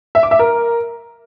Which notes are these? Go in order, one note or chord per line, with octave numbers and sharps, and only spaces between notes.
E5
D6
E5
A#4